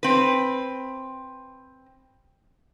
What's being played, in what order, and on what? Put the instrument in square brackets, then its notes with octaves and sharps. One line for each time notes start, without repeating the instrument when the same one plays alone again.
[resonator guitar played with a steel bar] C4 B4